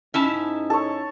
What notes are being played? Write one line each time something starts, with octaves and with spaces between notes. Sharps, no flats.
G#2 C#4 D#4 E4 A5
A4 C#5